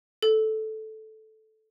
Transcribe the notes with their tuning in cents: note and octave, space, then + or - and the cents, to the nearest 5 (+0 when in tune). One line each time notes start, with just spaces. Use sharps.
A4 -10